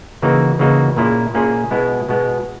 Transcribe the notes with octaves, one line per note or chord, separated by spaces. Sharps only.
C#3 E3 A#3 D#4 F#4
C#3 E3 A#3 D#4 F#4
A#2 A#3 C#4 E4 G#4
A#2 A#3 C#4 E4 G#4
B2 G#3 B3 E4
B2 G#3 B3 E4